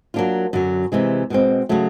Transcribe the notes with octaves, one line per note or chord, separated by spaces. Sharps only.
F#3 A#3 D4 F4
F#2 D3 F#3
C3 E3 G#3
B2 G#3 C4
C#3 F#3 A3